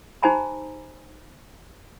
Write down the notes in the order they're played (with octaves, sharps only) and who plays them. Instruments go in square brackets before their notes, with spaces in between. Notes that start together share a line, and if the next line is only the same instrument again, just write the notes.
[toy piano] D#4 G4 C5 G#5 A#5 B5